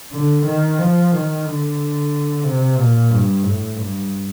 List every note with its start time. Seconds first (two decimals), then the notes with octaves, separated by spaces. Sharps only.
0.12 D3
0.46 D#3
0.78 F3
1.12 D#3
1.45 D3
2.44 C3
2.77 A#2
3.10 G2
3.43 A2
3.76 G2